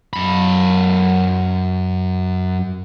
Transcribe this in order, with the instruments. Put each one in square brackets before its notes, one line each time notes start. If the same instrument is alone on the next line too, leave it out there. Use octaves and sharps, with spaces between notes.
[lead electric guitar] F#2 B5